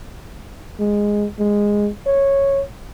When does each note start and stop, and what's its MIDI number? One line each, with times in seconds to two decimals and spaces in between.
0.80 1.26 56
1.39 1.89 56
2.07 2.62 73